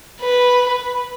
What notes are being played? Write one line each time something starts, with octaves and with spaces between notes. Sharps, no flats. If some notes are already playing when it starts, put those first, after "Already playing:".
B4